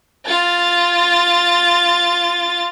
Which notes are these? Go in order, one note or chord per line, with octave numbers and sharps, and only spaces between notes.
F4 A6